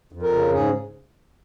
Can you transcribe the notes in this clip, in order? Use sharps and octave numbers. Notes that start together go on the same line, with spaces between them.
F2
A#4
C#3
G#2 G#4